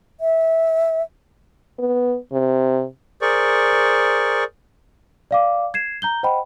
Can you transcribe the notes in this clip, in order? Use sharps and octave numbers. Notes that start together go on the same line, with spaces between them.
E5
B3
C3
G#4 A#4 C5 D5 C#6
D5 F5 D6
G#6 C7 E7
A#5 G6 G7
C5 D#5 F#5 G5 B5